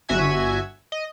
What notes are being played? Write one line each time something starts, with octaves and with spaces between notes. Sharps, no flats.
G1 F#4 E5 G#5 G#6
D#5